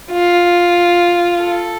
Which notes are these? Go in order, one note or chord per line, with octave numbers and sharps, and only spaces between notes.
F4
A4